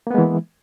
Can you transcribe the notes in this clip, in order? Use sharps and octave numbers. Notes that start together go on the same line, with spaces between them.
E3 G#3 A#3 B3